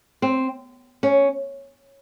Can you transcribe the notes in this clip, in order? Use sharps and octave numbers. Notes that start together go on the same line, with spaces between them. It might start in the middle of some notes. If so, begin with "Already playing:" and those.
C4
C#4